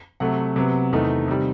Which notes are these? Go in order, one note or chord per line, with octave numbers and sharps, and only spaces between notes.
C3 F#3 A3 F#5
C3 F#3 B3
E2 C3 D#3 A3 D#4
C3 D#3 G3